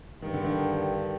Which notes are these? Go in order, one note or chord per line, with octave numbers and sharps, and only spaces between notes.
G2 D#3
D3
D#3